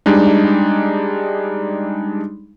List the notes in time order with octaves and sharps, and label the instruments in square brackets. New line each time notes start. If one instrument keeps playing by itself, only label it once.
[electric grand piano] G3 G#3 D4 D#4